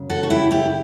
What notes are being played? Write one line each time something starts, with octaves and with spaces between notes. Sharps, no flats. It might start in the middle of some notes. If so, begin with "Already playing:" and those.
Already playing: F#2 C#3 F#3
F#4 A4
F#4
E4 G4
E4 G4